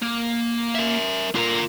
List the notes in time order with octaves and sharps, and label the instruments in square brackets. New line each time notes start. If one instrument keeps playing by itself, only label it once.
[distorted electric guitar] A#3
[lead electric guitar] A#4 E5
[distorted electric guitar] D3 A#5 [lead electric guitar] F4 A#4